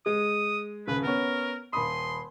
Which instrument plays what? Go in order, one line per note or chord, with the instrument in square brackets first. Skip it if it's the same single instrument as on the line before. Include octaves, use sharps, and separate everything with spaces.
[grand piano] G#3 [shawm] D#6
[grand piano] D#1 C#3 [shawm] B4
[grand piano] B3 C#4 [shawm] A#4
[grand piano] D#1 B5 D#6 [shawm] C6